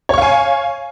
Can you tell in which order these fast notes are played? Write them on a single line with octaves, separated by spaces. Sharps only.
C#5 C#6 F5 G#5